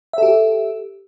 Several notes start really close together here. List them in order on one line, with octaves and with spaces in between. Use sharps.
E5 A4 G4